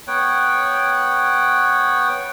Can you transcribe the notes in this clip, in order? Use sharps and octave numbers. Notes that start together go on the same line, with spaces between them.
B3 C#5 F#5 G5